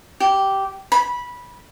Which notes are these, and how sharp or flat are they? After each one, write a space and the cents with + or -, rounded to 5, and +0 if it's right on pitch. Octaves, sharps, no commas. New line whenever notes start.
G4 -10
B5 -15